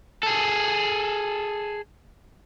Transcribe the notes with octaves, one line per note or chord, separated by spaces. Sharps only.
G#4 A4